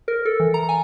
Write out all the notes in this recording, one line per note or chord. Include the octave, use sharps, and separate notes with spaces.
A#4
A4
E3
A#5
G#5